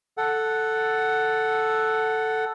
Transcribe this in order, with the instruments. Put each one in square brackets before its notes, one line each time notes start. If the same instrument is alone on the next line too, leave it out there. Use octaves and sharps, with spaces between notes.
[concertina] A4 F#5